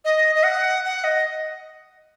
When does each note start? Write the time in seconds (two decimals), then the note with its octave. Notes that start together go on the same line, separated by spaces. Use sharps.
0.05 D#5
0.35 D#5
0.44 F#5
0.85 F#5
1.04 D#5